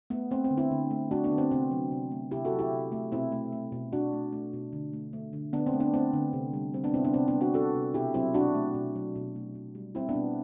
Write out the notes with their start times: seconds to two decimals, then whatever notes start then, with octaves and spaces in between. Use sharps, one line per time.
0.10 A3 B3
0.31 A3 C4
0.44 C4
0.51 D3
0.57 C4 E4
0.71 D3
0.91 A3
1.11 A3 D4 F#4
1.24 B3 D4
1.31 D3
1.38 C4
1.51 C3 C4
1.71 F#3
1.92 C3
2.11 A3
2.31 C3 E4 G4
2.45 F#4 A4
2.52 F#3
2.59 E4 G4
2.72 C3
2.92 A3
3.12 B2 C4 E4
3.32 A3
3.52 A3
3.72 B2
3.92 B2 D4 F#4
4.13 A3
4.32 A3
4.53 B2
4.73 D3
4.93 A3
5.13 A3
5.33 D3
5.53 D3 B3 D4
5.66 C4
5.73 A3
5.80 B3 D4
5.93 A3 C4
6.13 D3
6.33 C3
6.53 G3
6.74 G3 C4
6.84 B3 D4
6.94 C3 C4 E4
7.05 B3 D4
7.14 C3 C4
7.28 B3 D4
7.34 G3
7.41 D4 F#4
7.54 G3 F#4 A4
7.75 C3
7.94 B2 E4 G4
8.14 F#3 C4 E4
8.34 B2 D4 F#4
8.55 A3
8.74 B2
8.96 F#3
9.15 B2
9.36 A3
9.55 B2
9.75 G3
9.95 G3 C4 E4
10.09 B3 D4
10.15 B2